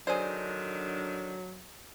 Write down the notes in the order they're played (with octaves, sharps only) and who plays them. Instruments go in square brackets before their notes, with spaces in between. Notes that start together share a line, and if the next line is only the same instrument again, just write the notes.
[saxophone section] D3 D#3 D4 [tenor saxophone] F#3 [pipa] G#4 C5 [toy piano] D5